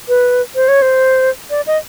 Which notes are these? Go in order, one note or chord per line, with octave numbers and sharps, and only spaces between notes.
B4
C5
C#5
C5
D5
D#5